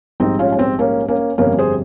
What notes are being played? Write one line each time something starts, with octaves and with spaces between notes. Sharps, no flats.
A#1 G#2 G3 C4 D#4
C#4 F4
C#4
C4
A#3 C#4
A#3 C#4
G1 F2 C3 G3 A#3 C#4
G#4 C5